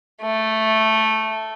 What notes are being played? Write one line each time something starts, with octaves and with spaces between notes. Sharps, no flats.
A3